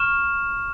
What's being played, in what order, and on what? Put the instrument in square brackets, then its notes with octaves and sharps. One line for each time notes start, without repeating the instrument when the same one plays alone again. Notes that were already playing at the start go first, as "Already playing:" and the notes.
Already playing: [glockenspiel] C#6 F6 E7